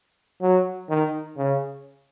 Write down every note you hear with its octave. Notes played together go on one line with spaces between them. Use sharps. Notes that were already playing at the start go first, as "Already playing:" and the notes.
F#3
D#3
C#3